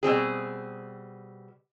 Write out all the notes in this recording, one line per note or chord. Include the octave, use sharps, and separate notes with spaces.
B2 G3 C4 G#4